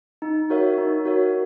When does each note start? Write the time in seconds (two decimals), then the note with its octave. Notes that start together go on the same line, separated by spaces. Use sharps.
0.22 D#4
0.50 F#4 A#4 C#5 E5
0.78 D#4
1.05 F#4 A#4 C#5 E5